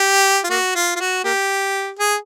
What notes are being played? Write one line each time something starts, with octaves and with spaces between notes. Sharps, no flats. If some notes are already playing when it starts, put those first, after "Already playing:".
Already playing: G4
F4
A#3 F#4
F4
F4
F#4
A#3 G4
G#4